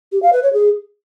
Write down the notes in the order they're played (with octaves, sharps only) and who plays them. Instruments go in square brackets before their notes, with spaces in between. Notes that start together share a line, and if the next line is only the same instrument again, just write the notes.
[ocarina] G4
F5
B4
C#5
G#4